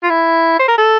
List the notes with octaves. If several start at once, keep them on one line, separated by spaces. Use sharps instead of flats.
F4
E4
C5
A#4
A4